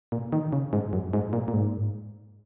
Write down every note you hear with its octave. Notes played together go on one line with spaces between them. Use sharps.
A#2
D#3
C#3
G#2
F#2
G#2
A#2
A#2
G#2